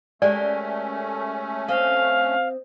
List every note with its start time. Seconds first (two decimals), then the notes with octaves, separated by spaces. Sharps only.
0.22 G#3 A3 C#4 G4 A#4 D5
1.68 C4 D#5 F5